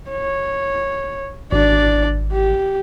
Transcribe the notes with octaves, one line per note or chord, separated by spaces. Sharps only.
C#5
G#1 D4 D5
G4